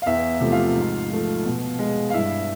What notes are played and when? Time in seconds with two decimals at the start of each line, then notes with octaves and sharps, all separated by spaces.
0.02 F5
0.06 E2 E4 E5
0.41 C3 F3 A3
0.52 F4 F5
0.76 G#2
1.10 F3 A3
1.45 B2
1.79 G#3
2.10 F5
2.13 G2 E4 E5